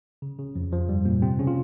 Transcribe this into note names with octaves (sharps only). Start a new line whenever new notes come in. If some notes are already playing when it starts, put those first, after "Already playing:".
C#3
C#3
F2 F3
F2 F3
G2 G3
A#2 A#3
C3 C4
C#3 C#4
F4